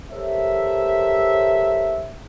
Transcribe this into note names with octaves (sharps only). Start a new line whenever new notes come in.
G4 A4 A#4 C5 C#5 E5